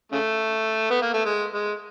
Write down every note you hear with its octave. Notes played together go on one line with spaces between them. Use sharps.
C#3 A3
B3
A#3
A3
G#3
G#3